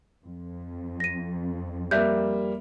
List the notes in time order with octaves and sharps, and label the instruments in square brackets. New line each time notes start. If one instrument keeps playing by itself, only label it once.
[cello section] F2
[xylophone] A#6 D#7
[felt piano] G3 A#3 [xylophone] E5 F#6 G6